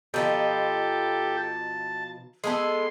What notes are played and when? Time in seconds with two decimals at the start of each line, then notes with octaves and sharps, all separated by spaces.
0.14 B2 F3 D#4 G4 A4
1.37 A5
2.44 G#3 B3 A4 C6